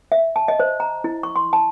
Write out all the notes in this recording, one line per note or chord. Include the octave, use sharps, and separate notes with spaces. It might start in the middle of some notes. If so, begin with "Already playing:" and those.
E5
A5
D#5
C5
A#5
E4
C#6
C6
A5